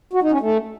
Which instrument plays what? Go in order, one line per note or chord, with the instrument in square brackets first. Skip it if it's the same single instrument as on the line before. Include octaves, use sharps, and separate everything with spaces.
[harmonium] F#4
D#4
C#4
A3